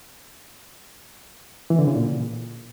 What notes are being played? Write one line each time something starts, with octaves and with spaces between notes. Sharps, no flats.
E3
D3
C#3
A#2